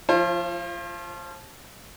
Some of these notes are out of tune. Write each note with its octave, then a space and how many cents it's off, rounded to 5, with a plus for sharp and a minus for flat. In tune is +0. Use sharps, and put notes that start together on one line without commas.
F3 +0 F4 -30 C5 +40